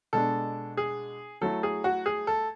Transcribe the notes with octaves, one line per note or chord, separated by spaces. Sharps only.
B2 G#3 D4 A4
G#4
F#3 A3 E4 A4
G#4
F#4
G#4
A4